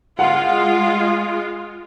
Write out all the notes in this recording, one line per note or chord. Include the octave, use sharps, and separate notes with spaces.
G#3 F4 F5 F#5